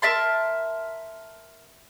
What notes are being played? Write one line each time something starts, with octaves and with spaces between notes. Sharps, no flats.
A#4 E5 A5 C6